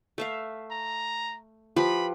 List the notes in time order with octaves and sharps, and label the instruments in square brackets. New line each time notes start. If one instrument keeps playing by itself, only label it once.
[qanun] A3 E5 F5
[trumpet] A#5
[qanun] F3 G4 B4 [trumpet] B5